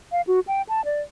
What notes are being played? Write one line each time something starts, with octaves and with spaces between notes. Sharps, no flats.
F5
F#4
G5
A5
D5